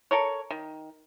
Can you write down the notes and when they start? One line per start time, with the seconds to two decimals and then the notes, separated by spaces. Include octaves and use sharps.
0.11 A4 A#4 C#5
0.50 D#3